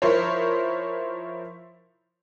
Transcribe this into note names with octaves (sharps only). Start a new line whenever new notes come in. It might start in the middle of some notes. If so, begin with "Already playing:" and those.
F3 E4 A#4 C5 C#5